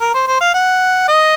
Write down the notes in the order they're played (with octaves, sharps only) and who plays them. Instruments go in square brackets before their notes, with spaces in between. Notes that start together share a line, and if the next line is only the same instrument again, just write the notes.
[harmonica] A#4
C5
C5
F5
F#5
D#5